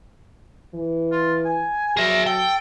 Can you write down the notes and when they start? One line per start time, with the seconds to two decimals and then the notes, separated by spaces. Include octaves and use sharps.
0.75 E3
1.12 F4
1.45 G#5
1.97 F#3 G#4 A#4 E5
2.26 A4 G5